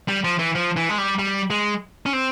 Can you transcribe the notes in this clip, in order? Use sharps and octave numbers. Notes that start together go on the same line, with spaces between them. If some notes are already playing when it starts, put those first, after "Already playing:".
G3
F3
E3
F3
E3
G#3
G3
G3
G#3
C#4
C4